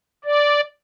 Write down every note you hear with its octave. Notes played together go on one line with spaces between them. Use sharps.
D5